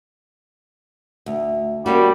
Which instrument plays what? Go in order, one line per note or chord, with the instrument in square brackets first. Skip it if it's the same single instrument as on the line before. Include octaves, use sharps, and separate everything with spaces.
[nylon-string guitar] D2
[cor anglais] G3 [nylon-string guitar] A#3 C#4 F#4